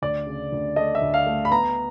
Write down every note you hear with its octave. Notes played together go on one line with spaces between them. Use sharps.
D2 D5
C#3
D2
A3 D#5
E5
D2
F5
A3
B5
B3 A#5